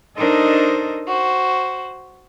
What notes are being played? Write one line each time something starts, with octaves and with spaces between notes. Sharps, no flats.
D4 D#4 A4 A#4 C5 D#5
F#4 C5